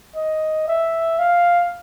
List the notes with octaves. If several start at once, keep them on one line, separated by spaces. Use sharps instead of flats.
D#5
E5
F5